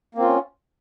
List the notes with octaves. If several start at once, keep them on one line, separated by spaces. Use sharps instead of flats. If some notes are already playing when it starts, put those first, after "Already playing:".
A#3 C4 C#4 F4